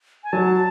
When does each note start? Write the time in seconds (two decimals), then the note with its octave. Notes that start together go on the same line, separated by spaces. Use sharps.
0.24 G#5
0.32 F#3 A5